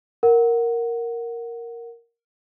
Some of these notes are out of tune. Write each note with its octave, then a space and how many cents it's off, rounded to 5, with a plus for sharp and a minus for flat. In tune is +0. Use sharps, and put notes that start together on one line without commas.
A#4 +0 F#5 +0